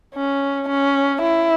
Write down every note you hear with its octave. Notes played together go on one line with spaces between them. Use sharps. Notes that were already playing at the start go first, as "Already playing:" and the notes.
C#4
C#4
E4